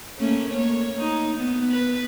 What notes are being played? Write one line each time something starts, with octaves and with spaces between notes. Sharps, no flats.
A3 A#3 C#4
A#3 C#5
D#4
B3
B4